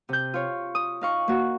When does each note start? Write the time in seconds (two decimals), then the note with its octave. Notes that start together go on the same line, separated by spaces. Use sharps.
0.09 C3 G6
0.34 F4 C#5
0.75 D#6
1.01 D#4 F5 C#6
1.28 A#3 F#4